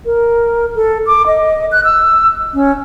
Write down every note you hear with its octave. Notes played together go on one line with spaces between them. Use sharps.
A#4
A4
D6
D#5
F#6
E6
C#4